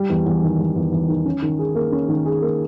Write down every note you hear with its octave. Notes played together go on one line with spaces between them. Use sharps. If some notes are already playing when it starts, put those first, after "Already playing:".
Already playing: G3
E2
E2
D#3
G3
E2
E2
D#3
C#4
D#3
G#4
A#3
C#4
D#3
G#4
A#3